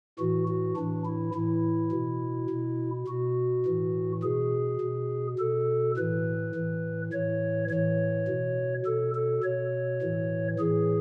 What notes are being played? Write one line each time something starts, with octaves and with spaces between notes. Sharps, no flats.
A2 E3 F#4
F#4
A2 E3 D4
E4
A2 E3 E4
B2
B2
B2 F#4
A2 E3
B2 G#4
B2
B2 A4
A2 E3 B4
A2 E3
A2 E3 C#5
A2 E3 C#5
B2
B2 A4
A4
B2 C#5
A2 E3
A2 E3 G#4